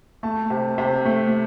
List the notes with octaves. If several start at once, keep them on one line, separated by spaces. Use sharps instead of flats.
A3 A5
C3
C3
A3